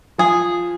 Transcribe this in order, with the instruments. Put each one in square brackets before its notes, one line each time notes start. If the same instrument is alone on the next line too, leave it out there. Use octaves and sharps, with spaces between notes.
[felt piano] F3 [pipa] G#4